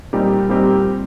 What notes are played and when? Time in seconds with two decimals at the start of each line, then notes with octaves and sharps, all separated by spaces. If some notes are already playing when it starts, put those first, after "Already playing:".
0.13 A#2 G3 C4 D#4 G4
0.49 A#2 G3 C4 D#4 G4